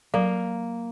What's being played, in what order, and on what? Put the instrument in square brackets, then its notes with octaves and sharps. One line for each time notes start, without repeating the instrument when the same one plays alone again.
[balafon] F#3 [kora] A#3